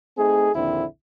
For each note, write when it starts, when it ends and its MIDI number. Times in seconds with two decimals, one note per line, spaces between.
0.18 0.50 57
0.18 0.50 60
0.18 0.50 63
0.18 0.50 68
0.55 0.84 34
0.55 0.84 39
0.55 0.84 50
0.55 0.84 60
0.55 0.84 64